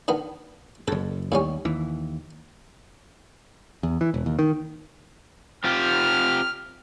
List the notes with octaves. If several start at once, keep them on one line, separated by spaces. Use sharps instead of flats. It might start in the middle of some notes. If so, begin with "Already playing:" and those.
D3 D#3 B3
F#1 F#2 A4
D#2 A2 G3 C#4
D#2 E3
E2
E3
E1
D#2
D#3
C4 F4 G4 F6